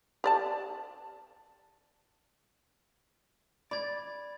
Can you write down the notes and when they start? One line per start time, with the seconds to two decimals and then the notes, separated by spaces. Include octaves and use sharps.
0.24 G4 D5 A5
3.71 D5 B5 G#6 A6